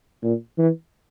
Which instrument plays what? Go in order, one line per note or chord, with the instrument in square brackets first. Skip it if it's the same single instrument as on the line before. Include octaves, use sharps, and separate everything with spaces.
[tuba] A#2
E3